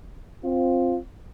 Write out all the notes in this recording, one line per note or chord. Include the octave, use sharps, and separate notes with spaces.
C4 F4